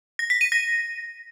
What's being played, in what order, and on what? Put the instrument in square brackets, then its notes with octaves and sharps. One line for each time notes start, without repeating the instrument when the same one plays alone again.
[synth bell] A#6
B6
D#7
A#6